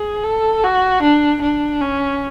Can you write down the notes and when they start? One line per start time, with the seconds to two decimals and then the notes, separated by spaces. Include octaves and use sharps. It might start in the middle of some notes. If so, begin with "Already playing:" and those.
Already playing: G#4
0.23 A4
0.63 F#4
1.02 D4
1.42 D4
1.81 C#4